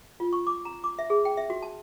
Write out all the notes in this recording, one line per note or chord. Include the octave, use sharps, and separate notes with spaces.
F4
C#6
D6
A#5
D6
E5
G#4
G5
E5
F#4
A5